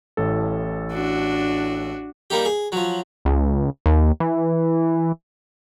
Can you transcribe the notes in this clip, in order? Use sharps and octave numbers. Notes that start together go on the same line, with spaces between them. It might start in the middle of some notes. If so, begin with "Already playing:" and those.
A1 A2 A4
D4 F#4
G3 A#3 D#4 G4
G#4
F3 F#3
C#2
D#2
E3